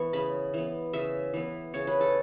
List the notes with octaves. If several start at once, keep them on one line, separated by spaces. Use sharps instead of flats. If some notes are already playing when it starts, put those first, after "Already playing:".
Already playing: E3 B3 C#6
C#3 B5
E3 B3
C#3 E5
E3 B3
C#3 C#5
B4
A4